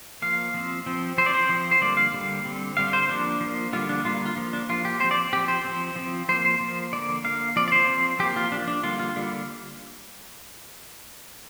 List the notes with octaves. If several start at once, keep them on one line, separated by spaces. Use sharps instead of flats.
F3 A#3 F5
F3 C4
F3 C4
F3 C4 C5 D5
C5
F3 C4
C5
D3 G3 A#3 D5
F5
D3 G3 A#3
D3 G3 C4
D3 G3 C4 F5
C5
F3 A#3 D4
F3 A#3
D3 G3 A#3 F4
D4
D3 G3 A#3 F4
F4
F3 A#3
D4
F3 A#3 F4
G4
F3 C4 C5
D5
F3 C4 G4
C5
F3 C4
F3 C4
F3 A#3 C5
C5
F3 A#3
D3 A#3 D5
D3 A#3 F5
F3 C4 D5
D5
C5
F3 C4
F3 A#3 G4
F4
F3 A#3 D4
D4
D3 G3 A#3 F4
F4
D3 G3 A#3